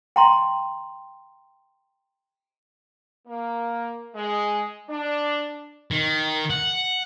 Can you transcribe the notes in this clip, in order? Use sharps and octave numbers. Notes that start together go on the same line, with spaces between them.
G5 A#5 C6
A#3
G#3
D4
D#3
F#5